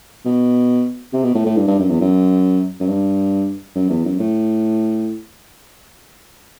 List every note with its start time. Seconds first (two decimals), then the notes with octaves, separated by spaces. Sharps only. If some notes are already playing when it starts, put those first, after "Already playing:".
0.25 B2
1.13 C3
1.24 B2
1.35 A2
1.46 A2
1.56 G2
1.67 G2
1.79 F#2
1.89 E2
2.01 F#2
2.80 F#2
2.88 G2
3.76 F#2
3.90 E2
4.05 F#2
4.20 A2